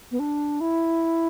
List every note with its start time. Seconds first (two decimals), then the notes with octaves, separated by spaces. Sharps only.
0.11 B3
0.19 D4
0.61 E4